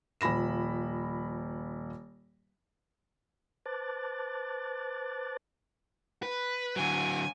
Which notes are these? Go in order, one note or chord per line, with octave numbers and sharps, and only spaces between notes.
D#1 F3 B5 A#6 E7
B4 C5 A5 D6 F#6 A6
B4
D3 F#3 G#5